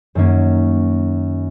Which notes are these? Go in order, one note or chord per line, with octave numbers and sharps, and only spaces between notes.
F#2 D#3 A#3 C#4